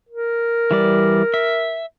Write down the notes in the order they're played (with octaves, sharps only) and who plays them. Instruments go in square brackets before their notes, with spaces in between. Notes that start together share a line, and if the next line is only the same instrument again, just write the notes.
[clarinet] A#4
[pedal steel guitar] E3 G3 D5
E5